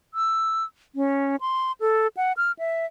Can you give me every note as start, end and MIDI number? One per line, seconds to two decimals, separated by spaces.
0.14 0.64 88
0.95 1.36 61
1.41 1.72 84
1.80 2.07 69
2.17 2.32 78
2.37 2.52 89
2.59 2.86 76